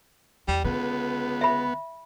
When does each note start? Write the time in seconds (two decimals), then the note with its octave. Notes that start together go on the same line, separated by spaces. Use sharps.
0.48 E2 G3
0.65 C#2 D3 B3
1.41 E5 B5